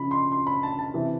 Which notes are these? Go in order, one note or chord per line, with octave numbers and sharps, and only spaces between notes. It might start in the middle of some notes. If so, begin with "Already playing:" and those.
Already playing: C#3 F3 B5
C6
C6
B5
A5
A5
C3 E3